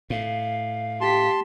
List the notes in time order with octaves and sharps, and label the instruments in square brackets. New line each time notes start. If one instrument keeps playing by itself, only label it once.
[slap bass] A2 [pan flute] F5
[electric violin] G4 B6 [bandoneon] A5 C6